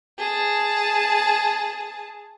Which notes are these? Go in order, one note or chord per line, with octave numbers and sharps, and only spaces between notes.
G#4 A5